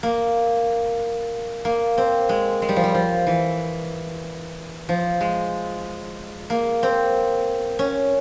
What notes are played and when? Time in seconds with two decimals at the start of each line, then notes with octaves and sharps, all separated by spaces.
0.03 A#3
1.65 A#3
1.98 C4
2.29 G#3
2.62 G#3
2.69 G3
2.76 F3
2.84 G3
2.94 F3
3.27 E3
4.89 F3
5.21 G#3
6.50 A#3
6.83 C4
7.79 C#4